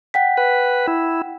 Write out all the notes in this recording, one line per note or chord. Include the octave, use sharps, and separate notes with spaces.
F#5 G5 B6
B4
E4